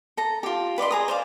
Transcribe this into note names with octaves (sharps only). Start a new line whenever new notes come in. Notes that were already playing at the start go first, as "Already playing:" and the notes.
A4 A#5
F4 G4
B4 D5 D#5 C6
G#4 A#5 D#6
C5 D5 F5